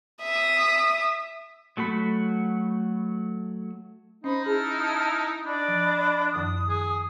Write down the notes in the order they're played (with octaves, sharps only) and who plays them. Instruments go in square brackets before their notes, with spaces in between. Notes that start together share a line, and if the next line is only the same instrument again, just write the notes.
[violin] E5 D#6
[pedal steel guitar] F#3 A3 F#4 B5
[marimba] C#4 [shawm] D#4 [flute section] C5 B5
[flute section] E4 A5 F6 [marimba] G#4
[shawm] D4 [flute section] D5 D#5 B5
[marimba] F3
[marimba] F#2 D#3 F3 [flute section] D#6
[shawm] G#4